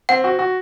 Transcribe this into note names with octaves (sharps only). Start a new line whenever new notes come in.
C4 F#5
F#4
F#4